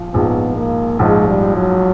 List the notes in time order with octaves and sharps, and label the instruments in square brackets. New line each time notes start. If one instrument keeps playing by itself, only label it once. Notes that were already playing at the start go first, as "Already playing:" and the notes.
Already playing: [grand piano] A#1 F3
[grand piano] A#1 G#2 F3 [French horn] B3
[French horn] A#3
[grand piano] A#1 G#2 F3 [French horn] G#3
[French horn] G3
F#3